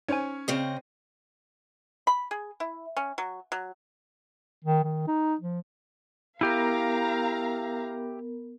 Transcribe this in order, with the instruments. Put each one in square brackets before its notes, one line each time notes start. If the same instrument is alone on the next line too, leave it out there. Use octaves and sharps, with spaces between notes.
[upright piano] C#4 [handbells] D#4 C5 G#5 [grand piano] C#5
[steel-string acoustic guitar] C#3 C4 D#5 [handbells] G#4
[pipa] B5
G#4
E4
C#4
F#3
F#3
[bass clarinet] D#3
D#3
D#4
F3
[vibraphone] B3 A#4 [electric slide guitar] E4 G4 [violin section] F5 A#5